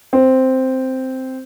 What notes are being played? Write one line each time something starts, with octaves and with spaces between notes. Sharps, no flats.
C4